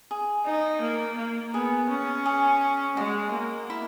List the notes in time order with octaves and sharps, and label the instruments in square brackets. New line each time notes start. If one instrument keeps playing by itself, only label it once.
[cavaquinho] G#4
[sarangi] D#4
A#3
A#3
[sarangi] B3 [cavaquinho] G#4
[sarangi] C#4
[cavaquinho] G#4
[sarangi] G#3 [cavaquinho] F#4
[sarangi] A#3
[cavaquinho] E4